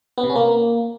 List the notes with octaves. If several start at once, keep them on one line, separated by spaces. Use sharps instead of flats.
B3
C3
C#4
A#3